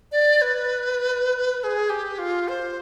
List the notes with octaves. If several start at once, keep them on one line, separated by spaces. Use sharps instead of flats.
D5
B4
B4
G#4
G4
F4
C5